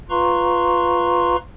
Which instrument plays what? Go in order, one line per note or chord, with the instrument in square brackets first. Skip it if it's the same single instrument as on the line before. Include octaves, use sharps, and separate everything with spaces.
[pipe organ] F4 B4 F5 A#5 C6 C#6